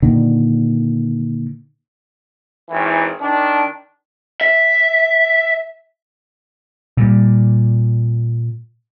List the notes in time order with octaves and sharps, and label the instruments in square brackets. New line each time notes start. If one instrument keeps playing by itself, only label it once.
[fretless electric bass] A#2 D3 D#3
[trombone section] G#1 E3
D#3 D4
[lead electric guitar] E5
[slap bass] A#2 G3